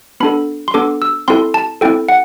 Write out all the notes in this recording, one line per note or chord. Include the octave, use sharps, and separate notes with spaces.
B3 D4 A4 B5
C6
B3 D4 A4 D6
E6
C4 E4 A4 C6
A5
C4 E4 A4 G5
F#5